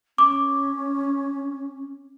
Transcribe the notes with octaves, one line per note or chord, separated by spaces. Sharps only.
C#4 D6